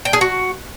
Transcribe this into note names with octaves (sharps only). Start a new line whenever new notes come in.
G5
G#4
F#4